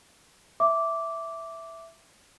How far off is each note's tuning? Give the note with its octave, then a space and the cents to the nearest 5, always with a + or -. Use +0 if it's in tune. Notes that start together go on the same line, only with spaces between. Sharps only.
E5 +0 D6 -10